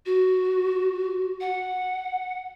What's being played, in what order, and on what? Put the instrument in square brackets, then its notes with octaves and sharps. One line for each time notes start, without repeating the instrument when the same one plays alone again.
[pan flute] F#4
F#5